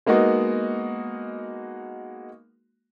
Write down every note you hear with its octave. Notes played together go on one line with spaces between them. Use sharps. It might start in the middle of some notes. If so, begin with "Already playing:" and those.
G#3 A#3 B3 D#4 F#4